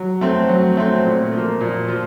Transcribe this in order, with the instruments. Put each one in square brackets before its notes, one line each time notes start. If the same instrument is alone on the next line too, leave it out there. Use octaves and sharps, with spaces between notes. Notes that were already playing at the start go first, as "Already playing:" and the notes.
Already playing: [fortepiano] F#3
A3 C4
F#3
A3 C4
A#2
F3 A#3
A#2
F3